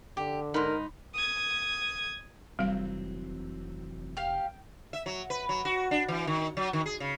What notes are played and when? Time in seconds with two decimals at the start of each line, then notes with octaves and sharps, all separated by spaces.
0.17 D3 G4
0.54 G#2 D#4 A#4 B5
1.14 D#6 G#6
2.59 F1 E3 F#3 G3 C4 F5
4.17 G4 F5 G5
4.93 E5
5.06 F#3
5.30 B4
5.49 F#3
5.65 F#4
5.91 D4
6.08 E3
6.27 D#3
6.57 F#3
6.73 D#3
6.86 G#4
7.00 C#3